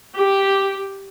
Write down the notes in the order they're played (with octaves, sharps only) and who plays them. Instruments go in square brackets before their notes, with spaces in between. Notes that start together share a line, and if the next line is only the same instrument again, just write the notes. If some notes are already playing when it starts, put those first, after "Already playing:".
[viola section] G4